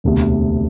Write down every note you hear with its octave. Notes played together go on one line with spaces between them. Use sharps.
E1 D2 C3